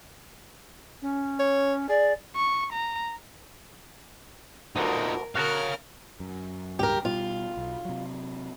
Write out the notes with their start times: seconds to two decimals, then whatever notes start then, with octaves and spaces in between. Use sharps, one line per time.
1.02 C#4
1.39 C#5
1.89 G#4 D5
2.36 C#6
2.73 A#5
4.76 D2 B2 D3 D#4 F4 A#4
5.35 F#4 A#4 C#5 F5 A5 A#5 F6
6.20 F#2
6.79 C#2 G2 G4 A#4
7.05 B2 G3 F4
7.57 B1
7.85 C3 F#3